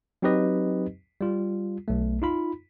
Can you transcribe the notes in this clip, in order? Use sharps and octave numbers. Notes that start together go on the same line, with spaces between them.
F#3 C4 D#4 G4 B4 D#5
G3 F4
B1 A3
D#4 F4 B5